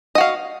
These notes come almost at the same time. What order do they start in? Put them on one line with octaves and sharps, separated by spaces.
D#5 F#4 F5